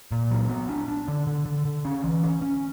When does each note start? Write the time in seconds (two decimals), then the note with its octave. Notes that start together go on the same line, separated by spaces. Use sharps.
0.12 A#2
0.31 F#3
0.49 B3
0.69 D4
0.88 D4
1.08 D3
1.27 D3
1.46 D3
1.65 D3
1.85 C#4
2.04 E3
2.23 C#4
2.42 C#4